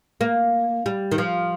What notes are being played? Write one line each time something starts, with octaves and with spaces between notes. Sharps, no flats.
A#3
G3
D#3
F3